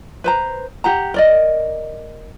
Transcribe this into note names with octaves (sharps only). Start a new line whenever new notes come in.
B4 C5 A#5
G4 F#5 A#5
A#4 D5 D#5